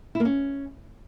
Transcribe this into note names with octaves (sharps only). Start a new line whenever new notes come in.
E4
A#3
C#4